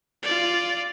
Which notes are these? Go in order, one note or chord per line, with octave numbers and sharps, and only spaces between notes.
F4 D5